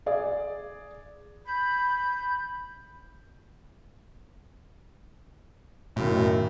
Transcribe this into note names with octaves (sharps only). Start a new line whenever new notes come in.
G#4 D5
B5 G6
B1 F#2 A2 D#3